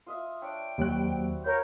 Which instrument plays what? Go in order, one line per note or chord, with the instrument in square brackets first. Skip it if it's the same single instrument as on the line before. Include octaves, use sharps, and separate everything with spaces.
[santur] F4 D#5 E5
[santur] D4 C#5 E5 [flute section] G5
[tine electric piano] D#2 F#3 F#6 [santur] G3 C4 F#4
[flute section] A#4 C#5 G6 [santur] B4 F5